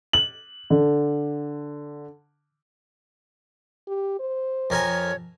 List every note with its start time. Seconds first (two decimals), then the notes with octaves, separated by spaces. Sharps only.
0.13 F#7
0.70 D3
3.87 G4
4.20 C5
4.70 F2 A#4 C#5 G#5